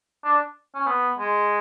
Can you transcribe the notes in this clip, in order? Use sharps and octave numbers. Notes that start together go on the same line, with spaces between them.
D4
C#4
B3
G#3